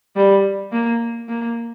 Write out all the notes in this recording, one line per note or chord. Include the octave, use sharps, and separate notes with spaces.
G3
A#3
A#3